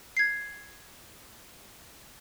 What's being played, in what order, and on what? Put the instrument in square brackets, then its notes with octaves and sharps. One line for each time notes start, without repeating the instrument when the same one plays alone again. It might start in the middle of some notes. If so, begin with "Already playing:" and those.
[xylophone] G#6 C7